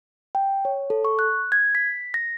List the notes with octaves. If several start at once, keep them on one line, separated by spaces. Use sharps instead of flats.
G5
C#5
A4
C#6
F#6
G#6
B6
A#6